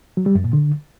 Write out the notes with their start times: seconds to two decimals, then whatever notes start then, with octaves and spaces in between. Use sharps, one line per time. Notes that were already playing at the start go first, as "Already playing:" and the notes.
0.17 F#3
0.26 G3
0.35 F#2
0.44 A#2
0.53 D3